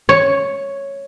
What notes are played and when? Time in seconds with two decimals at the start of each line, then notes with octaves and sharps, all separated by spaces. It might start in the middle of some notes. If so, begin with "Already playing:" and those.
0.09 C#5